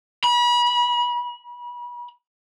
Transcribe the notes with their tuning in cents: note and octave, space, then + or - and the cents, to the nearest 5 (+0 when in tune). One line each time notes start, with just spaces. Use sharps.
B5 -35